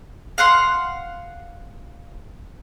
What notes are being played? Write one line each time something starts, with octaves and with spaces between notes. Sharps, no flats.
F5 F#5 C6